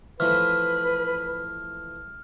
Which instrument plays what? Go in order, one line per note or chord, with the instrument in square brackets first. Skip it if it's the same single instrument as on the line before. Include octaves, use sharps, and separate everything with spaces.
[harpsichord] E3 F3 A3 [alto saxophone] B4 [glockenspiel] F6